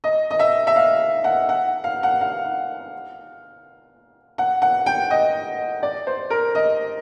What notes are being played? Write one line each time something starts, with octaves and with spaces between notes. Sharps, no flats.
D#5
D#5
E5
E5
F5
F#5
F#5
F5
F#5
F5
F#5
F#5
G5
D#5
D5
C5
A#4
D#5